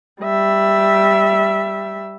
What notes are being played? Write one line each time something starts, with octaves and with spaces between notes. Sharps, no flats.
G3 E5